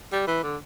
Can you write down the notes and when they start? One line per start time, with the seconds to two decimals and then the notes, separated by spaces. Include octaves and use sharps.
0.12 G3
0.27 E3
0.43 D3